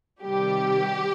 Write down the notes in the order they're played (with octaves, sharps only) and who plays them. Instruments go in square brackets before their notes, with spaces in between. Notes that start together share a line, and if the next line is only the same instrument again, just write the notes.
[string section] C3 D#3 G3 G4